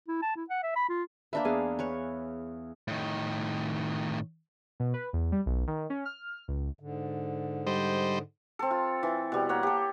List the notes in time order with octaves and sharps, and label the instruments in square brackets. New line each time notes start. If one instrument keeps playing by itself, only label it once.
[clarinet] E4
A5
E4
F#5
E5
B5
F4
[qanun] A#3 D4 B4 [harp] E5
[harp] E2 G#4 F5
[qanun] B4 C#5
[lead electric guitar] A2 D#3
[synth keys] B2
B4
E2
G3
B1
D#3
C#4
F6
C#2
[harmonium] G#2 D3
[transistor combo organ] G3 C5 D#5
[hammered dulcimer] C4 A4
F4
E3
B2 G3
A#3 C#5 F#5
G4 A4